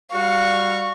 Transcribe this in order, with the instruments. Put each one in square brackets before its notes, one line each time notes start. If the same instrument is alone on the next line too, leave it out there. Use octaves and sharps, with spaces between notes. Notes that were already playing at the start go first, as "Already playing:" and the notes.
[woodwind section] G3 F#4 [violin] F5 [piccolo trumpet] C#6